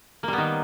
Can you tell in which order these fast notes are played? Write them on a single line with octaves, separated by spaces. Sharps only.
A#3 G3 B3 D#3